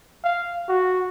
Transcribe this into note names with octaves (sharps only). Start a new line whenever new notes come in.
F5
F#4